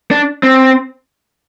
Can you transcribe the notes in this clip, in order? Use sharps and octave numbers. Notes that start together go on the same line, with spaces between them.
D4
C4